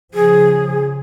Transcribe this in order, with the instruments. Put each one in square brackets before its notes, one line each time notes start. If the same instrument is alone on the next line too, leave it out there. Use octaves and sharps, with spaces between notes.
[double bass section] C#3 F3 [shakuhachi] G#4